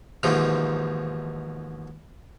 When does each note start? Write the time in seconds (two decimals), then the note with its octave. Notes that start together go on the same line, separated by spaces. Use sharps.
0.23 D#2 G#2 B2 E3 F3